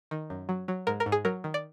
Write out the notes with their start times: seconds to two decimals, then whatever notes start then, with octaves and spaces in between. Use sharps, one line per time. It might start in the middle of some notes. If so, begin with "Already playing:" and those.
0.11 D#3
0.30 F#2
0.49 F#3
0.68 F#3
0.87 G#2 A#4
1.00 A#4
1.06 G#2
1.12 G#4
1.25 F#3 A#4
1.44 D#3
1.54 D5